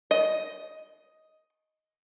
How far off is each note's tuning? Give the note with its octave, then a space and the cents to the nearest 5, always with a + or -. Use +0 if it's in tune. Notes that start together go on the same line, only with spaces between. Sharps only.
D#5 +5